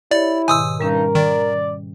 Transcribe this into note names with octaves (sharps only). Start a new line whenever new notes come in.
E4 G4 C#5 D5
G#2 B2 D#3 G#5 D#6 E6
G2 G3 C#4 D#4 A#4
D#3 D5